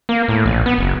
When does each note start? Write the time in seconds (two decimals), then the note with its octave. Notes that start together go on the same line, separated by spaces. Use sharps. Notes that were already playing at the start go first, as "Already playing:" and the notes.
0.09 A#3
0.28 A2
0.46 A#1
0.66 B3
0.78 F#1